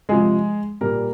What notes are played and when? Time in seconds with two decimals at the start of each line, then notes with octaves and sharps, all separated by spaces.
0.09 C3 F3 G#3 G#4
0.81 A#2 G3 A#3 A#4